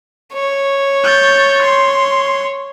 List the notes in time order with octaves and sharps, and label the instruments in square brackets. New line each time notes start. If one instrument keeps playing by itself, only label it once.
[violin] C#5
[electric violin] G6 A6
C6